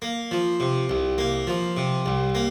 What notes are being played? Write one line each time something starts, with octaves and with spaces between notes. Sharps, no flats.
A#3
F3
C3
C2
A#3
F3
C3
C2
A#3